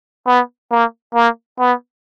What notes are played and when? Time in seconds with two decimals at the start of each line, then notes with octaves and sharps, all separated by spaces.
0.27 B3
0.71 A#3
1.15 A#3
1.59 B3